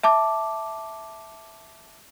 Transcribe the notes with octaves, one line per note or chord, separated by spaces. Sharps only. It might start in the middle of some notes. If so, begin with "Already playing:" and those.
E5 A5 D6